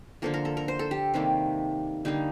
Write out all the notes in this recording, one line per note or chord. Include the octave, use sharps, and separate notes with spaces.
D3 F3 A#3 A4
A#4
A4
A#4
C5
A4
G4
C3 D#3 G3 A#3
D3 G3 A#3 D#4